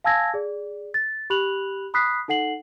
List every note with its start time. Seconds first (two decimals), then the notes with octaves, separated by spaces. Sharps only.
0.04 F5 G#5 A5 E6 G#6 A#6
0.34 G#4 D5
0.94 A6
1.30 G4 B5 F#6 F7 F#7
1.94 B5 D#6 F#6 B6 C7
2.28 D#4 A4 F#5 C7 F#7